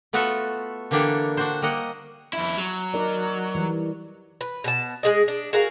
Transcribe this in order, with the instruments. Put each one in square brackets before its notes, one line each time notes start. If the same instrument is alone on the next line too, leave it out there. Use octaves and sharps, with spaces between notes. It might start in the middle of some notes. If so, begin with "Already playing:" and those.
[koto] A3 B3 F4 F#4 A4 E5
D3 E3 A#3 D4 G4 A4
D4 F#4 C5
G3 A#3 D#5 F#5
[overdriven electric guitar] F2 E4
F#3
[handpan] D#4 A#4 D5
E3 G3
[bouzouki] B4
B2 A5
G#3 G#4 D#5
D4
F#4 G#4 A#4 F5